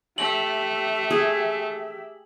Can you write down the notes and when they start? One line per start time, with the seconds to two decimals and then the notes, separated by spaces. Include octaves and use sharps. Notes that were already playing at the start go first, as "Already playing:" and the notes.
0.18 A3 G4 E5 F#7
1.10 G#4